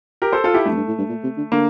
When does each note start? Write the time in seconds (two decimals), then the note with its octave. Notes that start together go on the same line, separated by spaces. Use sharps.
0.22 G4 A#4
0.32 A4 C5
0.44 F4 A4
0.54 E4 G4
0.65 G2 A3
0.71 F2
0.76 G2
0.88 A2
0.98 G2
1.09 A#2
1.23 C3
1.38 D3
1.52 D3 A#3